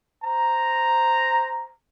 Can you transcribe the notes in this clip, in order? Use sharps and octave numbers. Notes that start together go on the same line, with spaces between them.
C5 A#5